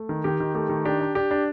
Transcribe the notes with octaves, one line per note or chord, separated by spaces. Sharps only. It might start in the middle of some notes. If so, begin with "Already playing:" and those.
Already playing: A3
D#3
D#3 G4
D#3
A3 G4
D#3
D4 G4
D4
D4 G4
D4